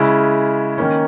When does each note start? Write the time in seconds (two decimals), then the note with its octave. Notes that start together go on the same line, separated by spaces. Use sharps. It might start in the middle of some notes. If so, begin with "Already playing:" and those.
Already playing: C#3 G#3 C#4 E4
0.78 D#3 A#3 C#4